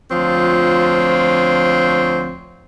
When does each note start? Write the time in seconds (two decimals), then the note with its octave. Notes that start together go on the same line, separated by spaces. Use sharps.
0.11 D2 F3 C4 F4 C#5